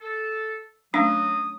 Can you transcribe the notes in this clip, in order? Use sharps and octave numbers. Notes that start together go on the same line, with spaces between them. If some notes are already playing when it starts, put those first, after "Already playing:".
A4
F#3 A3 C#4 D4 D#6